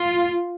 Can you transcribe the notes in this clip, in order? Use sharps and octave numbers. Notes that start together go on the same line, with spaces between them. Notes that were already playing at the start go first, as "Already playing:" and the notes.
Already playing: F4